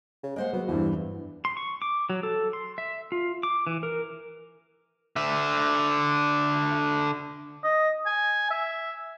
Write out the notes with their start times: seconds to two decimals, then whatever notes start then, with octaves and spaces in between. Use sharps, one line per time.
0.23 C#3
0.36 G#3 A#3 C5 F#5
0.53 F#3 B3
0.68 E2 G2 E3
1.45 C6
1.57 C#6
1.82 D6
2.10 F#3
2.23 A4
2.53 C6
2.78 E5
3.12 F4
3.43 D6
3.67 E3
3.83 A#4
5.16 D3 E5
7.64 D#5
8.06 G#5
8.51 E5